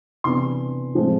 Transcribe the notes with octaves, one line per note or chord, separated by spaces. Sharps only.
C3 E3 B3 D4 C6
A2 F3 G#3 C4